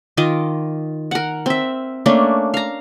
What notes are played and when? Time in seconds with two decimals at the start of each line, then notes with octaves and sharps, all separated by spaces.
0.17 D#3 F4 D#5 D6
1.11 A#4 F#5
1.46 C4 E5
2.06 A3 A#3 C#4 D4
2.54 F5 A#5